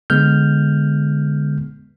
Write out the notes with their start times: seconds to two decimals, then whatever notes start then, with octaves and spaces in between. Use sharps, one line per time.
0.10 D3 G#3 B3 F6 G6